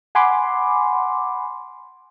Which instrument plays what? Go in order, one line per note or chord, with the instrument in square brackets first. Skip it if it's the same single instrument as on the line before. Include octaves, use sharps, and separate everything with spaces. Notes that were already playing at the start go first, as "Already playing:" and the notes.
[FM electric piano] F#5 G#5 B5 C6 D6